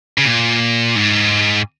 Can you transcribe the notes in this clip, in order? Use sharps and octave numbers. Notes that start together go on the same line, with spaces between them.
C#3
A#2
G#2